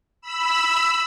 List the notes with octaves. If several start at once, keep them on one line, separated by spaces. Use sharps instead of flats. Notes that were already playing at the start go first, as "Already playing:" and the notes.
B5 E6